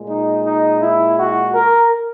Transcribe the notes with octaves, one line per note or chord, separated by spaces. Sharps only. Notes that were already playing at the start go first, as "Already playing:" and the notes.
Already playing: A#2 G#3
D#4
D#4
E4
F#4
A#4